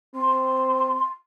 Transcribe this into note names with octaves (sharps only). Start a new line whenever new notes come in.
C4 C6